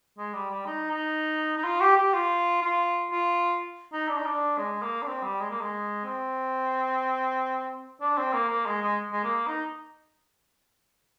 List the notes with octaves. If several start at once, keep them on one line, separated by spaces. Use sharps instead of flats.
G#3
G3
G3
D#4
D#4
D#4
F4
G4
G4
F4
F4
F4
D#4
D4
D#4
D4
G#3
A#3
D4
C4
G3
G#3
A#3
G#3
C4
D4
C4
A#3
A#3
G#3
G#3
G#3
A#3
D#4